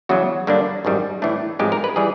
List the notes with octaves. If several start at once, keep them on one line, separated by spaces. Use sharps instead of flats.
E2 C#3 F#3 F#4
G2 D3 G3 A#3 D4
G#1 F#2 D#3 G3
A2 E3 A3 D4
A1 G#2 F3 G#3 C4 G4
A#4
B4
E3 G3 G#4